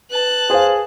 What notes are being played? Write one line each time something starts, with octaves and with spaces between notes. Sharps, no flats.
B4 A5 F#6
G#4 C5 F5